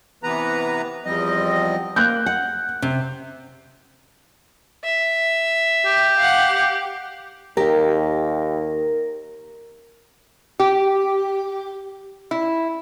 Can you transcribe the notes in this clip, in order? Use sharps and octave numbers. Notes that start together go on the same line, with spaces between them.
C3 E3 B3 B4 A#5
E2 F3 G3 C4 D#5
A#3 F#6 G6
F#5
C3
E5
G4
F5 F#5
D#2 G4 A#4
G4
E4